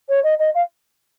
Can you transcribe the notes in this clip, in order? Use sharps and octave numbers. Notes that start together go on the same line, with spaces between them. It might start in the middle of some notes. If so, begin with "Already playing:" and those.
C#5
D#5
D#5
F5